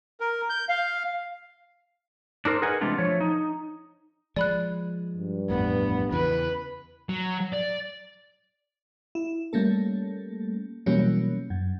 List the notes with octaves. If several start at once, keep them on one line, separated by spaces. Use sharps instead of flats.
A#4
G6
F5
D4 D#4 A#4 C5
G#4 A#4 B4 D#5 F#5 G#5
C3 E3 G#3 A3 D4 F4
F3 A3 C#5
D#4
F3 G#3 D5 B5 F#6
G2
A1 F2 A2 B3
E2 C#3 E3 B4
F#3
D5
E4
G3 A3 A#3 C#4 A4
B2 E3 F#3 G3 A#3 C#4
F#2